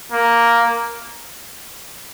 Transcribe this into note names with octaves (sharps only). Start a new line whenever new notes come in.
A#3